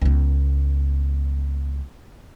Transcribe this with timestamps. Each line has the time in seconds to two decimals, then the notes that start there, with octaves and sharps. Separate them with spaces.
0.02 C#2 B3